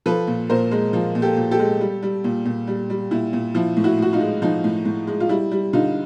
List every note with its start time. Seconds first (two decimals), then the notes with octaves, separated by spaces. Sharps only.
0.06 F3 A4 B4
0.27 A#2
0.49 A#2 A#4 C5
0.71 G#3
0.93 F3
1.15 A#2
1.22 G4 A4
1.37 A#2
1.51 G4 A4
1.59 G#3
1.81 G3
2.03 G3
2.24 A#2
2.46 A#2
2.67 G3
2.90 G3
3.11 A#2 E4
3.33 A#2
3.55 F3 E4
3.77 A2
3.84 E4 F#4
3.99 A2 F#4
4.13 D#4 F4
4.21 G#3
4.42 F3 D#4
4.64 A2
4.85 A2
5.07 G#3
5.20 F4
5.29 G3 E4
5.51 G3
5.73 D3 D#4 F4